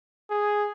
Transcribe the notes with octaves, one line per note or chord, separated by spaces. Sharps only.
G#4